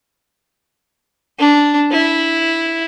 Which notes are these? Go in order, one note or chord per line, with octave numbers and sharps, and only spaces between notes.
D4
E4